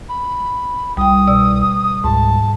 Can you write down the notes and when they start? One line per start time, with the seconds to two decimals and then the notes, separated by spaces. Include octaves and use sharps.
0.09 B5
0.97 C2 G3 G5 D#6
1.28 B2 D5 E6
2.04 C#2 G#2 A5